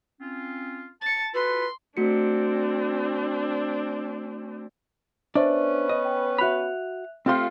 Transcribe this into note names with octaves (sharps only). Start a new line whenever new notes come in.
C4 C#4 F4
A5 A6 C#7
F4 F#4 A4 B4 C6
A3 C4 D4 F#4 C#7
B3 C#4 D4 B4 C5 D5 E5
D#5
G5
F#4 E5 B5 F#6 F7
A3 C4 F4 G4 C6